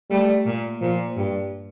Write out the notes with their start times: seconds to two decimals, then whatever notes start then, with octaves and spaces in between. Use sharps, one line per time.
0.11 G3 A3
0.46 A#2
0.81 A#2 F3
1.17 G2 G3